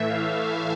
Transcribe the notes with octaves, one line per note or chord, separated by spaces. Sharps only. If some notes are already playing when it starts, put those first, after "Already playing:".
Already playing: A2 E3 A3 E5
F5